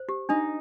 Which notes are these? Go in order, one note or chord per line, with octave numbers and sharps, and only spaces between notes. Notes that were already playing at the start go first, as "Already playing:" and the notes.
Already playing: C5
G4
D4 D#4